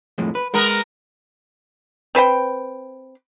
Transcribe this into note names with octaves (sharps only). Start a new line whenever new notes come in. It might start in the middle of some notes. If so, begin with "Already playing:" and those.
F2 A2 G#3
B4
G#3 B3 A#4
C4 B4 C5 G5